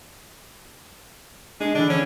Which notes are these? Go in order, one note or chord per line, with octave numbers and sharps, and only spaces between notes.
G#3 D4
D3 E3 D4
C#4